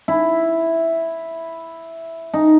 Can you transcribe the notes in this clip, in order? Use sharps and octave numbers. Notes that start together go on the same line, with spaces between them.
E4
D#4